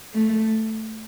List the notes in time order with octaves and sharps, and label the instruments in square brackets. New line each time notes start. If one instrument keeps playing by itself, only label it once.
[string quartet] A3